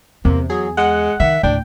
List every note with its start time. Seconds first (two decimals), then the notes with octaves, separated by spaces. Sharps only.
0.25 E2 C3 A#3
0.50 F#3 G#4
0.77 G#3 F#5
1.20 D#3 E5
1.43 D2 A2 D4 G5